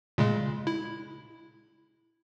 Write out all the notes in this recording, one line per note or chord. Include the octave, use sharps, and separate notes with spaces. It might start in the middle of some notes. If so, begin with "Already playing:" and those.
A#2 C#3 G#3
E4